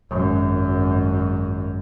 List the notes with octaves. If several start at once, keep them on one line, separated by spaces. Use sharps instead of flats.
G#1 F#2